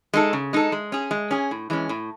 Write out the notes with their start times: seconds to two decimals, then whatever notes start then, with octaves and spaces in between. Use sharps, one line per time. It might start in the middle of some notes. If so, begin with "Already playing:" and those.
0.13 G#3 D#4 A4
0.33 C#3
0.53 G#3 D#4 A4
0.72 G#3
0.92 C#4 G#4
1.11 G#3
1.31 C#4 G#4
1.51 A2
1.70 E3 G#3 C#4
1.89 A2